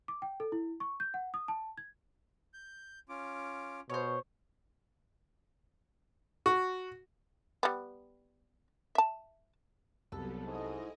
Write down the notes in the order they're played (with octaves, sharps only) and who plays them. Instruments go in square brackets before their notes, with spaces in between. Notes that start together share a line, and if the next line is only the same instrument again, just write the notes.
[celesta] D6
G5
A4
E4
C#6
G6
F#5
D#6
A5
G#6
[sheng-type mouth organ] G6
C#4 F4 D6
[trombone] B2 [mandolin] C5 C#5
[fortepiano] F#4
[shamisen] G3 B3
E5 A5
[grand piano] C2 [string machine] F#3 G3 B3 [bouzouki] A4
[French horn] G#2 [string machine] E4 G#4 D#5